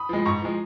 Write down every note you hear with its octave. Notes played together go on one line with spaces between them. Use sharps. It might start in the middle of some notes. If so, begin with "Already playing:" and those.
Already playing: B5 D#6
F3 G#3
G#2 A#5 C#6
F3 G#3